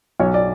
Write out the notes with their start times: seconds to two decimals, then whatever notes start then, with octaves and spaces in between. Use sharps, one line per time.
0.20 B1 C#5
0.34 D5